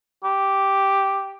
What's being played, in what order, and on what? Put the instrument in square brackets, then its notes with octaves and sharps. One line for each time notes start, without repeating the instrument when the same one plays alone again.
[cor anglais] G4